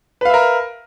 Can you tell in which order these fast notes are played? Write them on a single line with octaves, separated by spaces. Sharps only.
B4 F5 E5 A#4